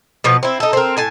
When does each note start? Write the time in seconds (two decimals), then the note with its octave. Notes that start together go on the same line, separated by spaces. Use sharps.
0.24 B2 F3 B3 B4
0.43 C4 E4
0.60 D#4 A4
0.73 C4 A#4
0.97 A2 G#5 A5